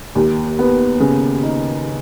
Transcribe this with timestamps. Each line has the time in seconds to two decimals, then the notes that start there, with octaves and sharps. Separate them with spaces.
0.15 D#2
0.59 B3
1.00 C#3
1.43 D#4